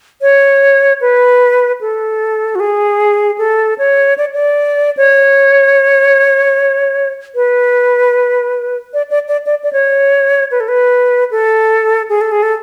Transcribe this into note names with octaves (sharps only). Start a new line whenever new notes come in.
C#5
B4
A4
F#4
G#4
A4
C#5
D5
D5
C#5
B4
D5
D5
D5
D5
D5
C#5
B4
A4
B4
A4
G#4
A4
G#4
A4